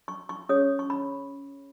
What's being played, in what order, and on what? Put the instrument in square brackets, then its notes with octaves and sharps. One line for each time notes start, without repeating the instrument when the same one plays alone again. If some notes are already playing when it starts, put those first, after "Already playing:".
[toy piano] C#6
C#6
C#4 G#4 C#5 D#6
C#6
B5